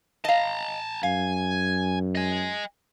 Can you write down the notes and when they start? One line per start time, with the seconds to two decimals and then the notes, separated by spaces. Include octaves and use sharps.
0.25 D#5 F5 A5 A#5
1.03 F#2 F5 G#5
2.15 D#5 G#5